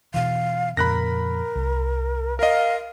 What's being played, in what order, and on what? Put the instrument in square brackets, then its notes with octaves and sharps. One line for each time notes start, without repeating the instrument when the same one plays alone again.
[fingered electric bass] B2 E3 [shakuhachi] F5
[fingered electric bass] F2 A#2 C#3 [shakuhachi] A#4 [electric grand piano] B5 F#6 A#6
[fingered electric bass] C2
[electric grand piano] A#4 D#5 [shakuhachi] F5